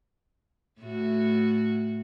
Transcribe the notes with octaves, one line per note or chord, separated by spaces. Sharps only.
A2 A3 F#4